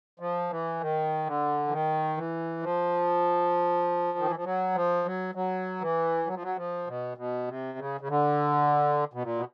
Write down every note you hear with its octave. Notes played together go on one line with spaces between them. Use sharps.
F3
E3
D#3
D3
E3
D#3
E3
F3
D#3
E3
F3
F#3
F3
F#3
F#3
E3
F#3
F3
F#3
F3
B2
B2
C3
C#3
C#3
D3
B2
A#2
B2